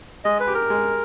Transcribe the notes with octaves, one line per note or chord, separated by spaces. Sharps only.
G#3 D#5
B4
G4
A#4
G#3